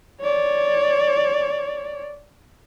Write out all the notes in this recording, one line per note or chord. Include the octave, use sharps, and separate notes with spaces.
C#5 D5